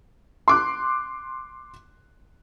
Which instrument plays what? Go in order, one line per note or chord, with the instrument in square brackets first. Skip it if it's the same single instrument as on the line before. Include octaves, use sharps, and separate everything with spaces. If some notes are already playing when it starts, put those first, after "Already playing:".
[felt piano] C6 D6 F#6